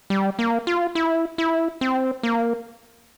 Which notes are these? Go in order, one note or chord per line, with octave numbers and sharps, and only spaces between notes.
G3
A#3
F4
E4
E4
C4
A#3